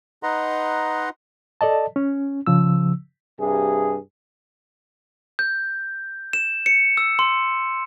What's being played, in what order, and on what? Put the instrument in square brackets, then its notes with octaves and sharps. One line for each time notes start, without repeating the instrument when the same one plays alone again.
[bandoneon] D#4 B4 D#5 F#5 A#5 C6
[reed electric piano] A4 D5 D#5 A5
C#4
C#3 F3 E6
[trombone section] G2 C3 G#4
[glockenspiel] G6
E7
C#7
E6
C6